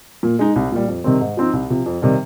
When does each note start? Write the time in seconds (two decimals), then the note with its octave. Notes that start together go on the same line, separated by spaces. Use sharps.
0.23 A#2
0.39 G#3 D#4
0.56 C2
0.72 A#2 G3
0.88 F2
1.04 C3 D#3 G3 C4
1.21 G#2
1.37 F3 C4 D#4
1.53 C2
1.70 C3 F3
1.86 F2
2.02 C3 D#3 G3